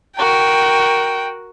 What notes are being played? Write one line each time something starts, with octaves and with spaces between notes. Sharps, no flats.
F#4 A#4 G5